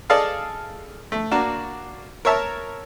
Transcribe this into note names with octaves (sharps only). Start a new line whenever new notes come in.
G#4 A4 D5 D#5 F5 A5
A3
A#3 D4 F#4
A#4 C#5 E5 A5